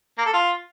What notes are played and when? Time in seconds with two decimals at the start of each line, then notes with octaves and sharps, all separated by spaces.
0.18 A#3
0.26 A4
0.33 F4